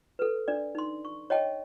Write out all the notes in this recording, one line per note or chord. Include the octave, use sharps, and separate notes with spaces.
A4 B4
D4 D5
D#4 C6
C#6
C#5 D#5 G5 A5